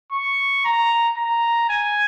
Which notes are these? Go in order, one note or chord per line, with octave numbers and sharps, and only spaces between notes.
C#6
A#5
A#5
G#5